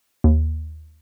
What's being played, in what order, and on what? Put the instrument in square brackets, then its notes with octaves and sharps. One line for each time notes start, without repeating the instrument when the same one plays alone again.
[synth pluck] D#2